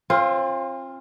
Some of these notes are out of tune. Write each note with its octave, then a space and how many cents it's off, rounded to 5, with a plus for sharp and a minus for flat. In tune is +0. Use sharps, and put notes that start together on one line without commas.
C4 +40 F4 +0